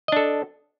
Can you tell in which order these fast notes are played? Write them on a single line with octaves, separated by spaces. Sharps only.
D#5 D4 A4